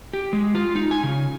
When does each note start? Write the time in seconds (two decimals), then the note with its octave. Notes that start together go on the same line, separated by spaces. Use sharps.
0.14 G4
0.33 G#3
0.55 F4
0.75 D#4
0.91 G#5
1.03 C#3